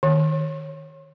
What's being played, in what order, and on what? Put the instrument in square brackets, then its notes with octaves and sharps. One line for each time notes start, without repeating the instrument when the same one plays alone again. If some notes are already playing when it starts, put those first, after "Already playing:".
[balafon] D#3